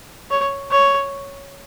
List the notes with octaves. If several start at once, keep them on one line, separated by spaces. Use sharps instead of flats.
C#5
C#5